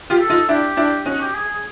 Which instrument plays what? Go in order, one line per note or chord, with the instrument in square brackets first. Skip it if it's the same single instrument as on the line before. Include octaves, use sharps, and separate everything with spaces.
[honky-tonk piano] F4 G4
[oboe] A4
[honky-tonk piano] D#4 F4
[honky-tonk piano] D4 E4 [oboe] G4
[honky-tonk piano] D4 E4
[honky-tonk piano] C#4 D#4 [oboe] F#4
[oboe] G4
G#4
G#4